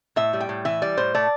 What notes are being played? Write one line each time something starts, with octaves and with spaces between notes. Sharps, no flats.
A2 E5
G3
G5
A2
E3 E5
G3 D5
A2 C5
A3 D5